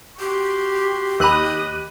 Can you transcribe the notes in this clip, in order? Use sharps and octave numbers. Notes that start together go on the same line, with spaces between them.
F#4 G4 C6
D#2 A#4 D#5 B5 D#6 F#6 D#7